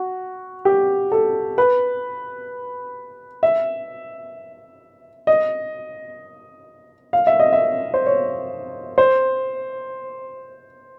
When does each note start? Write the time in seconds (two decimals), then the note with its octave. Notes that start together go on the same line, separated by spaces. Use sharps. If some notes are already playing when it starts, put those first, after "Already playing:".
Already playing: F#4
0.65 G4
1.12 A4
1.58 B4
3.43 E5
5.27 D#5
7.13 F5
7.27 E5
7.39 D#5
7.53 E5
7.94 C5
8.06 C#5
8.98 C5